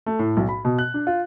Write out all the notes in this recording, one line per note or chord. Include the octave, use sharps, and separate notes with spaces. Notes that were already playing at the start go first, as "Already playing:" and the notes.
A3
A2
B1
B5
B2
F#6
D4
F4